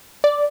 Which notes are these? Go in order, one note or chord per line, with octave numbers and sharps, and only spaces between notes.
D5